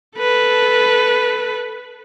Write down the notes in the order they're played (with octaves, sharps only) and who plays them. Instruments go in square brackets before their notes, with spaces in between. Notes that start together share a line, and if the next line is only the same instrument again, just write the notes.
[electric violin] A4 B4